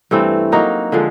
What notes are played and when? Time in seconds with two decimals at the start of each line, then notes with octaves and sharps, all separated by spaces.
0.11 G2 E3 A3 C4
0.52 F#3 A#3 D#4 F#4
0.92 D3 F3 G#3